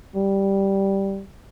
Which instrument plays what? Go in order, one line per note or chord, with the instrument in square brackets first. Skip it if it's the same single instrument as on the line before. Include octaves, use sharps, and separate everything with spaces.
[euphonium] G3